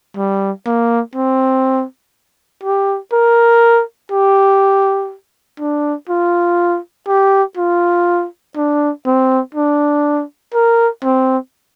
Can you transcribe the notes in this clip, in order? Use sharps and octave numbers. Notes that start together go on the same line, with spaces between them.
G3
A#3
C4
G4
A#4
G4
D4
F4
G4
F4
D4
C4
D4
A#4
C4